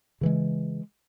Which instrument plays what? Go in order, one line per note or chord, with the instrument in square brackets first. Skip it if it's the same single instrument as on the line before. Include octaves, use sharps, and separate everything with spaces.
[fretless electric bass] C#3 E3 G#3